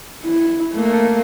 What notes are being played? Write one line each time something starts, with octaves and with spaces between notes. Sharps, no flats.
E4
A3 A#3